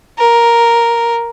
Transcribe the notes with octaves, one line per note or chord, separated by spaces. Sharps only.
A#4